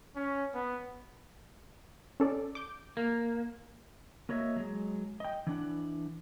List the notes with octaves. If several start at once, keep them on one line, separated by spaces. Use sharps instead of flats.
C#4
B3
C#4 A4 D5
D6 G6
A#3
A#3 F#4 C#5 D#5 E5
F#3 G#3
D#5 G5
E3 D4 F#5